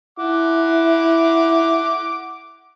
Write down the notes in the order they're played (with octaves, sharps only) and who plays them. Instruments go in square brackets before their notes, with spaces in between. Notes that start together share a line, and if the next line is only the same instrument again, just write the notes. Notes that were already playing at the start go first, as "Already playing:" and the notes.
[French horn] E4 [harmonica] F#5 D6